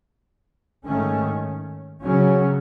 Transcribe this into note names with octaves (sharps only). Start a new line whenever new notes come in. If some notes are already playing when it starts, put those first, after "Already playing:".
G#2 D#3 A3 C#4
C#3 F#3 C#4